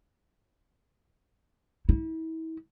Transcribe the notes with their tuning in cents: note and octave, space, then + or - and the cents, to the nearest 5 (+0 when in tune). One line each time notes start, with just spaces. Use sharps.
E4 -35